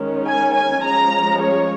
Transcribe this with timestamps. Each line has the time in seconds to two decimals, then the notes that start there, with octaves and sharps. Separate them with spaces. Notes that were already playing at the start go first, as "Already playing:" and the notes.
Already playing: D#3 G#3 C#4
0.28 G#5
0.56 G#5
0.84 F3 G#3 C#4 A#5
1.41 C#5